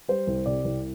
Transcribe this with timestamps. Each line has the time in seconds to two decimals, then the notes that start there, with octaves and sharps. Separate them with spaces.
0.08 G3 C5
0.27 C2
0.46 C3 D5
0.65 C2